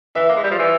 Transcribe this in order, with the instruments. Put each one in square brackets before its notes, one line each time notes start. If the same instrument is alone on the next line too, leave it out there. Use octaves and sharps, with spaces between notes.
[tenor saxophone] E3 [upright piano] E5
[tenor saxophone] A#3
G#3
G3
F3
E3